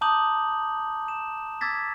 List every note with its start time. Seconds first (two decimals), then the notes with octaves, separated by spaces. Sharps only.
0.01 A5 A#5 D6 D#6 G6 F#7
1.08 E7
1.61 D6 E6 G#6 A6 B6